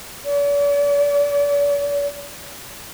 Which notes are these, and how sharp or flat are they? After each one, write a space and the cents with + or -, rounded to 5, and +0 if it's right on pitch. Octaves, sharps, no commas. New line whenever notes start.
D5 -45